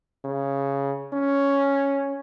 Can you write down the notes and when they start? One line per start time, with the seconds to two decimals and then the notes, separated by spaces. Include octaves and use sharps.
0.25 C#3
1.13 C#4